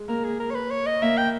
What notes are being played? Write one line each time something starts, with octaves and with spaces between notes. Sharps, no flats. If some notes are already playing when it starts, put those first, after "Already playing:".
Already playing: G#3
A#3 A#4
G#4
A#4
C#5
B4
C#5
D#5
A#3 E5
G5